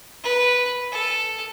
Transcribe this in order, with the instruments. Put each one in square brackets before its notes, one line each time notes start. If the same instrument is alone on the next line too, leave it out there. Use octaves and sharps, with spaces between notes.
[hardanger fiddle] B4
A4